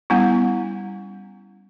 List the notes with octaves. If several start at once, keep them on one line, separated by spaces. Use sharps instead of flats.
G3 B3 C#4 E4